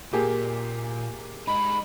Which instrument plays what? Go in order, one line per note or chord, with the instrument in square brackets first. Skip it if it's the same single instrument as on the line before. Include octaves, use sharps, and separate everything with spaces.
[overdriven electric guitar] A#2 [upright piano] A#3 G4 G#4
[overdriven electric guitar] G#3 D#4 [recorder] B5